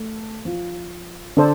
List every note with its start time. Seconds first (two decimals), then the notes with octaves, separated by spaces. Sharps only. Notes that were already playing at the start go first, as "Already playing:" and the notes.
Already playing: A3
0.45 F3
1.37 D3 D4 A4 C5